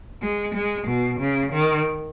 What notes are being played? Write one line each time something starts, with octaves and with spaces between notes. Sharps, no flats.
G#3
G#3
B2
C#3
D#3